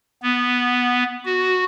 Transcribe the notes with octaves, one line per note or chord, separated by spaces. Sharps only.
B3
F#4